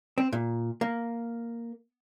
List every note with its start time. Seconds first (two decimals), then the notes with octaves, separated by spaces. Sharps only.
0.18 C4
0.33 A#2
0.81 A#3